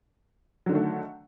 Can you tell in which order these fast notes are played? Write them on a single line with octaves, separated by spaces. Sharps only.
F#3 D3 D#3 A3